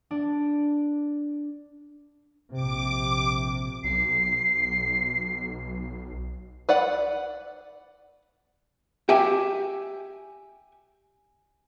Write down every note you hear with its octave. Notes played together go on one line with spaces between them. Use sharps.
D4
A#1 C3 D6
B1 C7
B4 D5 F#5
G4 E5 G#5